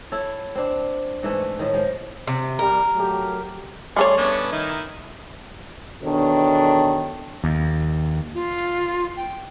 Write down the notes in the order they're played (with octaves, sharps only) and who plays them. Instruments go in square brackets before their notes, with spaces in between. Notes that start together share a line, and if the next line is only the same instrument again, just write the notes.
[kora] E4 A4 C#5
C4 D4
G#2 E3 A3
A2 D#3
F3 G#3
[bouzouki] C3
[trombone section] G3 [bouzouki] A#4
[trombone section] F#3 A3 G4
[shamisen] G3 A3 C#5 [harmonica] G#4 D5 C6
[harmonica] B3 C#4 D4
D#3 D#4 E4
[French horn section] E2 B2 D#3 D4 A4 C#5
[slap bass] D#2
[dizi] F4
G5